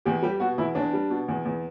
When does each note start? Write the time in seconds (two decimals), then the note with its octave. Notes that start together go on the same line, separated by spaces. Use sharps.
0.05 E2 G4
0.22 G3 G4
0.40 B2 F#4
0.58 E2 E4
0.75 E2 D4
0.93 G3
1.10 B2
1.28 E2
1.45 E2